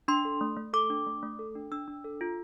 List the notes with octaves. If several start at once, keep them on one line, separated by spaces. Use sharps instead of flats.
D4 C6
A4
A3
A3
A4 D6
D4
A3
A3
A4
D4
D4 E6
D4
A4
F4